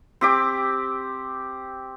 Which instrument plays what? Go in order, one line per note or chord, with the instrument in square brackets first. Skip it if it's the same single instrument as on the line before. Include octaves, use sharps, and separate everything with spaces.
[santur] C4 G4 D6